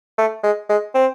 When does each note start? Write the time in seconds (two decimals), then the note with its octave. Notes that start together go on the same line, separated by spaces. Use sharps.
0.18 A3
0.44 G#3
0.69 G#3
0.95 C4